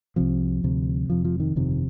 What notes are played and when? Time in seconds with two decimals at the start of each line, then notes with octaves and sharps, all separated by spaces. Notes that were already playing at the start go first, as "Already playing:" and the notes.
0.16 C2 C3 F3
0.64 D2 C3
1.09 F1 F2 C3 F3
1.25 F3
1.40 D#3
1.55 G1 F2 C3 D#3